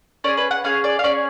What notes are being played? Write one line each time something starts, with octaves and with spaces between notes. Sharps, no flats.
C#4 G#4 D5
B4
F#5
C#4 G#4 F5
D5
F5
C#4 G#4 D5